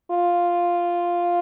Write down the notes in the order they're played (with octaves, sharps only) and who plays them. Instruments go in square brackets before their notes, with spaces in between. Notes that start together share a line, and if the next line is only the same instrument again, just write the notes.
[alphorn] F4